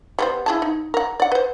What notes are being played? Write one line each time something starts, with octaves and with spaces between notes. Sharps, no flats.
G3 B3 C5
E4 G#4 A5
D#4
A#4 F#5
D5 F#5
B4 C5